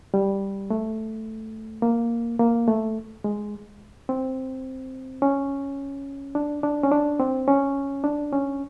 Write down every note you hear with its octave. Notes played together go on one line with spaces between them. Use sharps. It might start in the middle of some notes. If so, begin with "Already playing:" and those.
G3
A3
A#3
A#3
A3
G#3
C4
C#4
D4
D4
C#4
D4
C4
C#4
D4
C#4